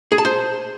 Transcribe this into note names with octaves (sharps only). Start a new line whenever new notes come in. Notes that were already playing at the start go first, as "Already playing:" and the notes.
G#4
A5
C5